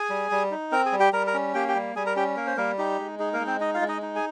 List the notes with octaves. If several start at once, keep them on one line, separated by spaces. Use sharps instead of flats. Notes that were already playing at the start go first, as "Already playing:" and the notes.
Already playing: G#4 G#5
G3
G3
D#4
C4 A#4 A#5
G#4 G#5
G3
G4 G5
G3 A#4 A#5
A#4 A#5
C#4
A#3 G4 G5
G4 G5
G3
G3 G#4 G#5
A#4 A#5
C#4 G4 G5
A#3 A#4
C5
G3 A#3 A#4
D#4 G4
G#3
D#4 G#4
A#3 A#4
G#3
C4 C5
D#4 D#5
F4 F5
G#3
D#4 D#5
D#4
G#4 G#5